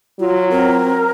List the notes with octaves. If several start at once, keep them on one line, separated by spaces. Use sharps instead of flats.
F#3 F4
C4 A#4